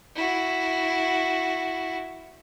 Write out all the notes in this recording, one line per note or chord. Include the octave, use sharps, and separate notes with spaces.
E4 F#4